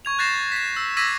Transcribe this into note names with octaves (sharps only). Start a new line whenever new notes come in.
C#6 G#6 F7
F#6 G6 A6 A#6 C7 E7
B6 E7
E6
D6 E6 G#6 A#6 B6 D#7